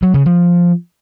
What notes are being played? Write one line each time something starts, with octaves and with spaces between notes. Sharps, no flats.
F#3
C#3
F3